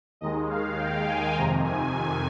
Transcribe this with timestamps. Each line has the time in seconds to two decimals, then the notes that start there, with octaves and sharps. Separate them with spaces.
0.21 D#2 D#3 G#3 D#5
0.50 F5
0.78 G5
1.07 G#5
1.35 F2 C3 D#3 A#5
1.64 G#5